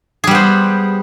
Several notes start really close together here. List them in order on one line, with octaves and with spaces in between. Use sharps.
G#4 G3 B3 C5